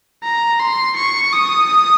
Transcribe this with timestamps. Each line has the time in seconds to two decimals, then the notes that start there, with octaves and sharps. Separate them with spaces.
0.23 A#5
0.59 C6
0.96 C#6
1.33 D#6